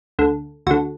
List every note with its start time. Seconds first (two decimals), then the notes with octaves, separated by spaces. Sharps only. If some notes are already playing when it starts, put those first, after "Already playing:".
0.19 D2 D3
0.67 D2 D3 F#4